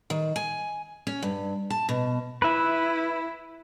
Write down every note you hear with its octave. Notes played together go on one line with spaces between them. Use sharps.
D#3
G#5
C#4
G2
A5
B2
E4 B4 E5